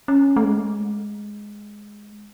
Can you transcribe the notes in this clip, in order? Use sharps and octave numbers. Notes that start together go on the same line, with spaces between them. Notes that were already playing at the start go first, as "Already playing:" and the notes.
C#4
A3
G#3